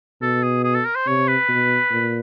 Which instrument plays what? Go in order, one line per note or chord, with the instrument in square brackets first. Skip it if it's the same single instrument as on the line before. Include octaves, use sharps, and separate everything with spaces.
[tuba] B2 [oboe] A4
[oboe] G#4
G#4
A4
A#4
C5
[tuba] C3 [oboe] C#5
[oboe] B4
[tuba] B2
A#2